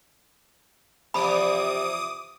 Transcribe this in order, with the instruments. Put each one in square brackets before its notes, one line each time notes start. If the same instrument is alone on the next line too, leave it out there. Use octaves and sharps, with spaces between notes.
[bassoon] C3 [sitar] E3 F3 D5 [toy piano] B5 [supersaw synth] D6 D#6